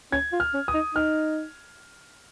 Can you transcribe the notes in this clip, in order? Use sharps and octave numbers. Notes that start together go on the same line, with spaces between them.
C#4 G#6
F4
F6
C#4
D#6
D#4
D#4 F6